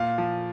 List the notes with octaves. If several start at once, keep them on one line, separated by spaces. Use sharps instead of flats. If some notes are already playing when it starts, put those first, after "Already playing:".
Already playing: A#2 F5
F3